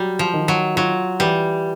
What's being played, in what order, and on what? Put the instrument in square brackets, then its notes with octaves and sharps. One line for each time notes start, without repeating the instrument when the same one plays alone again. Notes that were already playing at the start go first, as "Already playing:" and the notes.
Already playing: [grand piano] F#3 [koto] G3
[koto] F3
[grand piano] D#3
[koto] F#3
[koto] F#3 [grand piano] F4
[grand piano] E3 [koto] G3